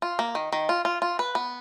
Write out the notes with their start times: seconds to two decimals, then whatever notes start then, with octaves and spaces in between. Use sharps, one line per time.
0.02 F4
0.19 A#3
0.35 D#3
0.52 D#3
0.69 F4
0.85 F4
1.02 F4
1.19 B4
1.35 B3